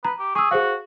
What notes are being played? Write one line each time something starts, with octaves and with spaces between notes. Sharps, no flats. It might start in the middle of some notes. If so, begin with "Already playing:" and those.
B4 A#5
G4
G#4 C#6 E6
F#4 G#4 C5 F5